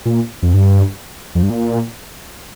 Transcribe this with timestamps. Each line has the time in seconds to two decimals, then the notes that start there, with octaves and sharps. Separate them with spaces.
0.05 A#2
0.42 F2
0.54 G2
1.35 F2
1.43 G2
1.50 A#2